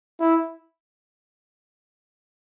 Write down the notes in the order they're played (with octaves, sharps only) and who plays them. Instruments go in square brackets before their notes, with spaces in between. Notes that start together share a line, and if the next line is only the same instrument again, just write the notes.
[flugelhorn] E4